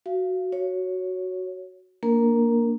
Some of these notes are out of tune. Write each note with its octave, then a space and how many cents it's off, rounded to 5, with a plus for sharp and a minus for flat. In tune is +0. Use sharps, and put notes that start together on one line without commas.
F#4 +0 F5 -25
F#4 +0 C#5 +0
A#3 +0 D4 +0 A#4 +0